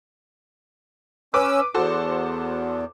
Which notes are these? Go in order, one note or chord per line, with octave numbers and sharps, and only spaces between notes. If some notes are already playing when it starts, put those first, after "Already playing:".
C#4 B4 D6 E6
E2 F#4 A4 C5